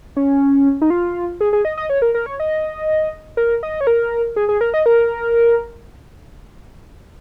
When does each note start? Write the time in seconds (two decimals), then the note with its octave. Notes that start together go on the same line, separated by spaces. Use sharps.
0.17 C#4
0.82 D#4
0.90 F4
1.41 G#4
1.53 G#4
1.65 D#5
1.77 D#5
1.90 C#5
2.02 A#4
2.15 A#4
2.26 C#5
2.40 D#5
3.37 A#4
3.63 D#5
3.81 C#5
3.87 A#4
4.36 G#4
4.49 G#4
4.61 A#4
4.74 D#5
4.86 A#4